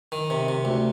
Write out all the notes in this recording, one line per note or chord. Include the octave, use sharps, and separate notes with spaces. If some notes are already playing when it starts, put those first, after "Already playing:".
D#3
C3
C3
D2